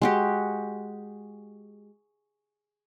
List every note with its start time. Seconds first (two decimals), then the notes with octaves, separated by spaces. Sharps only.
0.02 G#3 F#4 G4